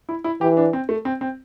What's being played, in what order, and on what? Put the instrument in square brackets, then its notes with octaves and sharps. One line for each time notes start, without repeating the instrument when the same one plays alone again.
[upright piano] E4
E4
[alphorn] E3 [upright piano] G4
[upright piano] D4
C4
A3
C4
C4